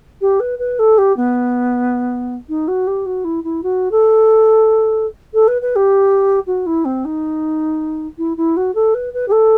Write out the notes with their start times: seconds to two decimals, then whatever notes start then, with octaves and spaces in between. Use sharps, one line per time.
0.21 G4
0.40 B4
0.59 B4
0.79 A4
0.98 G4
1.16 B3
2.49 D#4
2.68 F#4
2.87 G4
3.06 F#4
3.24 E4
3.44 E4
3.63 F#4
3.91 A4
5.34 A4
5.48 B4
5.62 B4
5.76 G4
6.47 F#4
6.66 E4
6.85 C4
7.05 D#4
8.18 E4
8.37 E4
8.57 F#4
8.75 A4
8.94 B4
9.13 B4
9.28 G4
9.32 A4